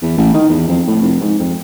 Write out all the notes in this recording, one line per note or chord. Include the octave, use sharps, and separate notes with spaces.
E2
A1
D#3
E2
F2
A2
F1
G#2
F2